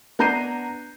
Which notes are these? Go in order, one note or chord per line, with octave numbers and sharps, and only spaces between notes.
B3 D4 A#5 G6 C7 D#7